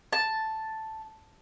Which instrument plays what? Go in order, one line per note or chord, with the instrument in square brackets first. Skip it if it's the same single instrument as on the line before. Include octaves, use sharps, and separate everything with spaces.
[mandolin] A5